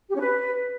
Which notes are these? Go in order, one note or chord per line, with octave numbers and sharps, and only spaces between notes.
G4
C#4
B4